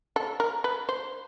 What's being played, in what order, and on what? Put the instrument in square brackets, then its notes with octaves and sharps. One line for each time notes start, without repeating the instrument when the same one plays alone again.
[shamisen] A4
A#4
B4
C5